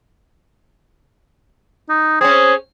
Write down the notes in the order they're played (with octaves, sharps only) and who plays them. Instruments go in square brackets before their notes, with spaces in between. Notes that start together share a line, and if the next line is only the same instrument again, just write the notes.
[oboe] D#4
[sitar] C4 C#4 [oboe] G#4